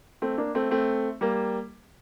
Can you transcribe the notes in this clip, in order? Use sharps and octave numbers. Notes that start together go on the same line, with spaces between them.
A3 C4
A#3 D4
A3 C4
A3 C4
G3 A#3